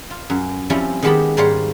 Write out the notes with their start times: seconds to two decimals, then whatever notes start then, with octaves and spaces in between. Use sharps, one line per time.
0.10 F4
0.30 F#2
0.70 F3 G3 C4 C#4 E4
1.02 D#3 G#3 B3 G4 A5 B5
1.37 G#2 G3 C5 C#5 F5